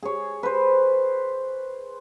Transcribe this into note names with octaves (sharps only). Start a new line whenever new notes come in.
G#4 C#5
B4 C5